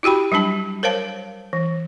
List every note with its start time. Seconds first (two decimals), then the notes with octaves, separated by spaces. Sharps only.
0.03 E4 F#4 G4 G5 B5
0.32 F#3 G3 D4 A5
0.83 A#4 C5 C#5 F5 A5
1.53 E3